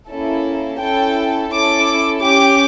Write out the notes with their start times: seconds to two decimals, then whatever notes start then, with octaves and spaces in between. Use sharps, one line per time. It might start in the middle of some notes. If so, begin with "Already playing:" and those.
0.10 A#3 C#4 E4 A4
0.81 C#4 E4 A4 G5
1.52 C#4 E4 A4 D6
2.23 C#4 G4 D6